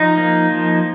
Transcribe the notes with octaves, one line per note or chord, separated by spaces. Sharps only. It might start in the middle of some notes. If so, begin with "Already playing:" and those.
Already playing: F3 D#4
A#3
F3